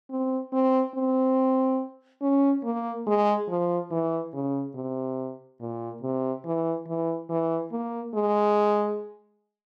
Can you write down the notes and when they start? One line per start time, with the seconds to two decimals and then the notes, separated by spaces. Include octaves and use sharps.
0.11 C4
0.52 C4
0.95 C4
2.22 C#4
2.64 A#3
3.07 G#3
3.49 F3
3.91 E3
4.34 C#3
4.75 C3
5.61 A#2
6.03 C3
6.45 E3
6.87 E3
7.30 E3
7.72 A#3
8.14 G#3